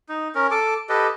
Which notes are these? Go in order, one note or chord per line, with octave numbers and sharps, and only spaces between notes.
D#4
C#4 A#4
A4 D6
G4 A4 B4 D#5